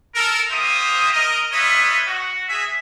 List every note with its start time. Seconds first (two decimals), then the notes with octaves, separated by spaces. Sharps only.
0.15 A4 A#4
0.50 A#3 C4 F4 C5 E5 D#6
1.12 A#4 D#5
1.52 E4 F4 B4 C#5 D#5 E5
2.06 F#4
2.48 G#4 E5